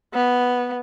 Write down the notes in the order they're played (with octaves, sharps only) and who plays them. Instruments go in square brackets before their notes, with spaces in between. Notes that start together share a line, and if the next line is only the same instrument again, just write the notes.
[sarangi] B3